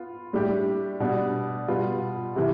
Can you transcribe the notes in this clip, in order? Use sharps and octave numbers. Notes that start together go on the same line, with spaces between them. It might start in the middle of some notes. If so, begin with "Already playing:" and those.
Already playing: B3 F4
A2 G3 D4 G4
B2 G3 D4
B2 G3 B3 F4
C3 E3